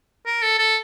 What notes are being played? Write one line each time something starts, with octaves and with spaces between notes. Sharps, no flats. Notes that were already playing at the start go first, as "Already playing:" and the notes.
A#4
A4
A4